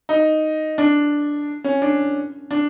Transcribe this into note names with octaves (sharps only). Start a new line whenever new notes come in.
D#4
D4
C#4
D4
D4